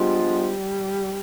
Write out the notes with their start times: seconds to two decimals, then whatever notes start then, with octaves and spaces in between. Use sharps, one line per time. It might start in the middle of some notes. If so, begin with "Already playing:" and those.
Already playing: F3 G3 G#3 B3 D4 F4
0.32 G3